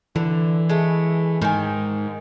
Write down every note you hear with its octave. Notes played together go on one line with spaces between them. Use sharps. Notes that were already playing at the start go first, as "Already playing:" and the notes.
D3 E3
G#3 A3
G#2 D#3 G#5